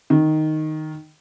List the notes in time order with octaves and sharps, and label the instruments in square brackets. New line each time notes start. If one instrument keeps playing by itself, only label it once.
[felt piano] D#3